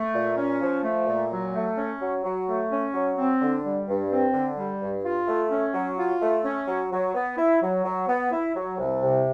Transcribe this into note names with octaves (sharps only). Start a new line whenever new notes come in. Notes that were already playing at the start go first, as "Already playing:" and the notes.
Already playing: A3
A#2
C#4
F3
A3
A#2
F#3
A3
C#4
F#3
F#3
A3
C#4
F#3
C4
D3
G3
G2
C4
D3
G3
G2
F4
A3
C#4
F#3
F4
A3
C#4
F#3
F#3
B3
E4
F#3
F#3
B3
E4
F#3
C2
C3